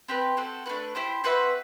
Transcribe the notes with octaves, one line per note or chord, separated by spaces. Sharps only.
C4 G4 B4
C4 F#4 A4
A3 D4 F#4 B4
E4 G4 C5
C4 F#4 B4 E5